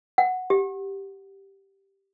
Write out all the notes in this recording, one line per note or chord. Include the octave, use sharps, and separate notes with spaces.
F#5
G4